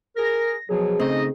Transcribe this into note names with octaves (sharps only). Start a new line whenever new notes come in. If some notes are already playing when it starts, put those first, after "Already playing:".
G#4 A#4 A#6
B2 F3 F#3 G#4
C#3 A3 C4 D#4 D#5